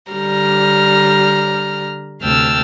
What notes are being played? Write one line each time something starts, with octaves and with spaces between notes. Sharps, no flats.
D3 G3 A#5 F6
D2 C3 G5 A5 E6 F6